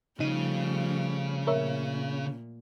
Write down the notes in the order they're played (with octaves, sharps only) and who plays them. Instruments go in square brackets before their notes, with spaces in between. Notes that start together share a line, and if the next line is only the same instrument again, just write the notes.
[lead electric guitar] C#3 [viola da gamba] F3 G3 A3 [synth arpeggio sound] D#4 D#7
[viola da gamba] A#2 [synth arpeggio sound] A#4 C#5 E5